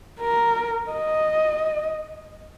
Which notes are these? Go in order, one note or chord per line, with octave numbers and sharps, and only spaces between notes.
A#4
D#5